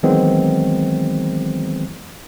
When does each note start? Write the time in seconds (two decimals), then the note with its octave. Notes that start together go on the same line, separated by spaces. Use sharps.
0.03 D#3 E3 F#3 G#3 B3 C4